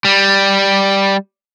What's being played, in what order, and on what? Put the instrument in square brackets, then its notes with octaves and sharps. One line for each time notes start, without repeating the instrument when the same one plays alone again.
[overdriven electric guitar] G3